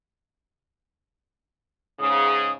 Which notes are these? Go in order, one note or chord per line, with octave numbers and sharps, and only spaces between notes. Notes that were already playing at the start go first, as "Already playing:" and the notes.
G#2 C#3 D#6